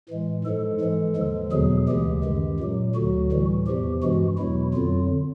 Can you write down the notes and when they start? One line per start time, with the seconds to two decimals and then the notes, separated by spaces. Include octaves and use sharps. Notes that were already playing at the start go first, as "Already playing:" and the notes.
0.09 A2 E3 G#3
0.44 G#2 F3 G#3 A4
0.81 G#2 E3 G#3
1.16 D#2 D3 F3 G#3
1.52 E2 B2 F#3 G#4
1.88 D2 C#3 E3 G#3 G4
2.24 F#2 D#3 G#3
2.60 A#2 F#3
2.95 D2 D3 F#3 F#4
3.32 A2 E3 G3
3.67 E2 C3 F3 G4
4.02 G2 E3 G#3 F#4
4.38 E2 B2 F#3 E4
4.74 F2 D3 F#3 F4